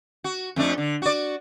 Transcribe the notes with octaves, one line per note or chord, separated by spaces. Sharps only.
F#4
F2 A3 D4
D3
F#4 D5